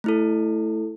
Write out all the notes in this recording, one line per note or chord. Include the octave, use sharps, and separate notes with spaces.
A3 E4 A4